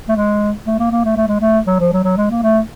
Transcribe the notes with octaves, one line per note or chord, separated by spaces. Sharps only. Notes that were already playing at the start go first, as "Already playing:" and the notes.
A3
G#3
A3
A#3
A#3
A3
A3
G#3
A3
F#3
F3
F#3
F#3
G#3
A#3
A3